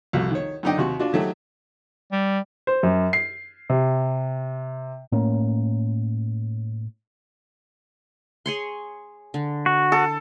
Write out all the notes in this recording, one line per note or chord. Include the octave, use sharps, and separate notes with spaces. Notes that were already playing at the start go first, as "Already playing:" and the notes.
C2 F2 F#4
D#3 C#5
F#2 D3 D#4 D5 D#5 G5
D#2 C3 F#4 C#6
D4 F4 F#4
D#3 F#3 A3 F#4 G4
G3
C5
F#2
C7
C3
A2 A#3 C#4
G#4 C#5 C6
D3
F#4
A4